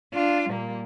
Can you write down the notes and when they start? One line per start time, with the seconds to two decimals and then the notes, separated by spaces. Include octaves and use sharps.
0.13 D4 F4
0.48 A#2 G3 A#3